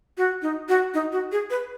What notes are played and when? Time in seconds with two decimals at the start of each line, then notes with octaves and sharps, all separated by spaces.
0.18 F#4
0.42 D#4
0.69 F#4
0.94 D#4
1.12 F#4
1.32 G#4
1.50 B4